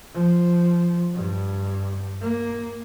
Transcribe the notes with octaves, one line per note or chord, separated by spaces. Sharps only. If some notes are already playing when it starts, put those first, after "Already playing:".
F3
G2
A#3